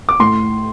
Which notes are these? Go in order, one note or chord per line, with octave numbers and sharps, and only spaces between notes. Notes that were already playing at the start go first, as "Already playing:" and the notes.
D6
A2 C6